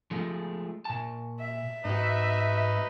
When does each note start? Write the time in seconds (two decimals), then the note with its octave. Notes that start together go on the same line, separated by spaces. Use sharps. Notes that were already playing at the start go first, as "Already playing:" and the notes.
0.11 F3 G#3 A3
0.85 A#2 A5
1.40 E5
1.85 G#2 D#4 F#4 B4